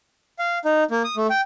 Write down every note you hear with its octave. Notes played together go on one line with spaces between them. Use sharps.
F5
D#4
A#3
D#6
A3
G5